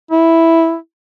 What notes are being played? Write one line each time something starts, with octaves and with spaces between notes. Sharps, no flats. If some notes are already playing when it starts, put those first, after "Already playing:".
E4